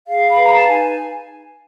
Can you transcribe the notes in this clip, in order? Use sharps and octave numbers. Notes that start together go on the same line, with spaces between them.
G#4 F5
B5
B4
A#5
A5
D#4 G#5